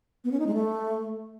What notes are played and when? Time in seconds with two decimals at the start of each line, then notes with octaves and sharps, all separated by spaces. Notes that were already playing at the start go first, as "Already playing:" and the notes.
0.24 B3
0.32 C#4
0.39 D#4
0.47 G#3
0.54 A3